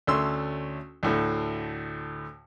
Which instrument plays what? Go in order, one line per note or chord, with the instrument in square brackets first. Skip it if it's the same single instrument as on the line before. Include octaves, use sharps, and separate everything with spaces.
[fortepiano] D2 A3 C#4 C#5 C6 E6
D2 A2 D3